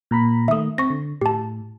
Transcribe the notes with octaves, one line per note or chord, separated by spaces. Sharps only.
A#2 A#5 B5
D#3 A3 E5 D#6
C4 C#6 A#6
D3
A2 G4 A5